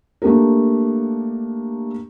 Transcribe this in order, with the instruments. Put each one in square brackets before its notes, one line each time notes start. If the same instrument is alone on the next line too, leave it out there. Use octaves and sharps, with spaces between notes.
[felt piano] A3 A#3 D4 G4 A#4